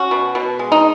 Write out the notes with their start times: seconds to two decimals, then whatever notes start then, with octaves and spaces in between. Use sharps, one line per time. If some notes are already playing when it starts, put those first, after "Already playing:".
Already playing: C#4 F#4
0.11 B2
0.35 B2
0.59 G#3
0.72 D#4